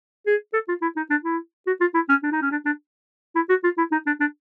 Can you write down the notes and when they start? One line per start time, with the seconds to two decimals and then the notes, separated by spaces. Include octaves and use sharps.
0.27 G#4
0.53 A4
0.69 F4
0.82 E4
0.96 D#4
1.10 D4
1.24 E4
1.67 F#4
1.81 F4
1.95 E4
2.09 C#4
2.23 D4
2.32 D#4
2.42 C#4
2.51 D4
2.66 D4
3.35 E4
3.49 F#4
3.64 F4
3.78 E4
3.92 D#4
4.06 D4
4.20 D4